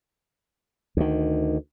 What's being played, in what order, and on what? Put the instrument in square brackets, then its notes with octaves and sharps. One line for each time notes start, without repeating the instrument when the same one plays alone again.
[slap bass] D2 D#3